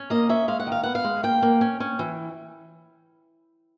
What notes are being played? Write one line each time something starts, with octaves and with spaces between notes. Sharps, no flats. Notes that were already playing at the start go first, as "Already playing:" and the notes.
Already playing: C#4
A#3 D#5
C#4 E5
G#3 F5
F#5
D#3
F5
B3 F#5
F5
G#3
A#3 G5
A#3
C#4
C#4
E3